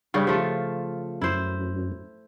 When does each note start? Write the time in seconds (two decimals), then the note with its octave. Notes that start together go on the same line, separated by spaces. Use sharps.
0.14 G2 C#3 G3
0.27 F3 A3 F4
1.22 F#2 E4 C5